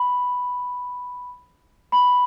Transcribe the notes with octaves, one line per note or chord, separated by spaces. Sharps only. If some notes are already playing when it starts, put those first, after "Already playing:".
Already playing: B5
B5